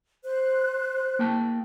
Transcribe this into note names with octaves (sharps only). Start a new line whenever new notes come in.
C5 F#6
A#3 G5 A5